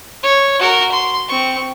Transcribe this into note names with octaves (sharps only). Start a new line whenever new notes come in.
C#5
F#4 A#4
C6
C4 C#6